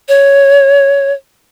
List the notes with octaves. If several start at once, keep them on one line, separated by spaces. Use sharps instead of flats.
C#5